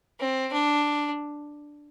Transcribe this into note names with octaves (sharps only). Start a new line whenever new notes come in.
C4
D4